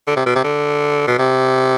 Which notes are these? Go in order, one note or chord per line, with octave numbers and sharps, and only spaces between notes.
D3
C3
B2
C3
D3
B2
C3